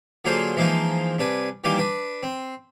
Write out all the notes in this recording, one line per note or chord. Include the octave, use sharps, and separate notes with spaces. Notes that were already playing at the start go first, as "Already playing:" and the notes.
D3 F#3 A#3 F4 G#4 C5
E3 F3 G#3 A#3 D#4 F4
C2 D4 B4 G#5
D#3 E3 G3 A#3 G#5 D6
D4 B4
C4